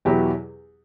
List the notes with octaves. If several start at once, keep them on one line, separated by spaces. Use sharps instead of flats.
E2 B2 F#3 E4 G4